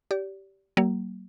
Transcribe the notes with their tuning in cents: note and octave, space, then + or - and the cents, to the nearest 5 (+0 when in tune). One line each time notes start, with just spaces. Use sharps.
G4 -15 D5 -30
F#3 +45 A#3 +0